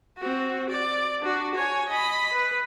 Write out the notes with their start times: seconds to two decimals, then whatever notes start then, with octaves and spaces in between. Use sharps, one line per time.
0.17 C4 F#4
0.69 D5
1.21 D4 F#4
1.55 C#5 G#5
1.89 D#5 B5
2.33 B4